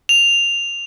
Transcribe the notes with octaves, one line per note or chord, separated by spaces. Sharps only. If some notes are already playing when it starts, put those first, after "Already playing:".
F7